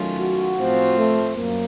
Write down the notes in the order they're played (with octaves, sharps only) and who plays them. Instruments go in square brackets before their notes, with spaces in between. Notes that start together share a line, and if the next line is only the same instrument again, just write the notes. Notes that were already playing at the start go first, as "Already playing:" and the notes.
Already playing: [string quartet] D#3 F#3 A3 C#4 F4
[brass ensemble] F#4
[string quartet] A2 F3 C4 F4
[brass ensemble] A3
[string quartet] F#2 [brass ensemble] A#3